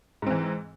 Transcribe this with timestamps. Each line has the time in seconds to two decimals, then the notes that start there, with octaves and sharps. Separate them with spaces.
0.22 G#2
0.27 C4
0.31 E3